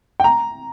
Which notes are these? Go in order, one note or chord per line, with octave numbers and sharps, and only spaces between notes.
G5
A#5